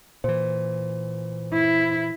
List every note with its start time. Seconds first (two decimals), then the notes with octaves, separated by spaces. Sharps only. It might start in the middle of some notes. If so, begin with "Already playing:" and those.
0.24 A#2 E3 C5
1.53 E4